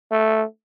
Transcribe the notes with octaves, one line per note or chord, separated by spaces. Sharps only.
A3